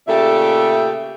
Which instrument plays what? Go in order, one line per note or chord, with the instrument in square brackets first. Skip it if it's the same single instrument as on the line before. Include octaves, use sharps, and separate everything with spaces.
[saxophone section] A#2 C#3 A3 G4 A4 E5